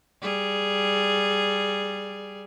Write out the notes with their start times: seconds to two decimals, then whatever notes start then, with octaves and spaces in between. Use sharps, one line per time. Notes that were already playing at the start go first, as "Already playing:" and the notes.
0.22 G3 G#4